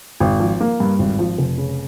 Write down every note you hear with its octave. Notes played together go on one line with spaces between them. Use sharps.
G#1
F3
A#3
G2
G#1
F3
F1
C#3